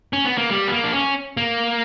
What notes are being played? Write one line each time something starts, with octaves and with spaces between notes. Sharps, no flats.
C#4
B3
A#3
G3
B3
A#3
D4
C#4
A#3